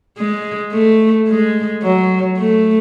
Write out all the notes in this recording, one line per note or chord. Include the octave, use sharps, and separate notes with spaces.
G#3
A3
G#3
F#3
A3